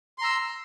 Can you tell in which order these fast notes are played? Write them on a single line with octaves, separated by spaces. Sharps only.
C6 A#5 E6